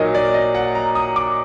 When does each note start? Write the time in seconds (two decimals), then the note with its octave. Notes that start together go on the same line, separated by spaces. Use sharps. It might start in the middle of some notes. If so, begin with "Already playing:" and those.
Already playing: A#2 F#3 A#3 D#4 D#5
0.15 D5
0.34 D#5
0.55 F#5
0.75 A#5
0.95 D#6
1.16 D6